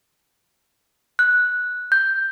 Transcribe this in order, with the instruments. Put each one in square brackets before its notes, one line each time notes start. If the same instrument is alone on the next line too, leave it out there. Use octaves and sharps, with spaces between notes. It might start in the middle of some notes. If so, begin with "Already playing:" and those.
[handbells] F#6
G6